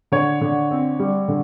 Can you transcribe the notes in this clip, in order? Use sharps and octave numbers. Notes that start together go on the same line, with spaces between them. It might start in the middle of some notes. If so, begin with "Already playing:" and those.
D3 C#5
D3
C4
G3
D3